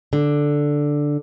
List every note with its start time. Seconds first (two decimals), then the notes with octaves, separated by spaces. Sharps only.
0.13 D3